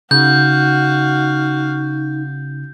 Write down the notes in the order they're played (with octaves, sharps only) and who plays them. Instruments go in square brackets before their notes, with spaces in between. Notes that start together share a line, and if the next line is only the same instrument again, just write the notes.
[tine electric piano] C#3 [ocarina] D#4 [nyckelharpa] F#4 F5 [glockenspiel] G6